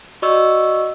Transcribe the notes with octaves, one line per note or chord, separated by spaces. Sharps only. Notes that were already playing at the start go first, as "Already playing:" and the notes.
F#4 D5 D#5 C#6 E6